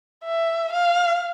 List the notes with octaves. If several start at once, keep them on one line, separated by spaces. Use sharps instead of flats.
E5
F5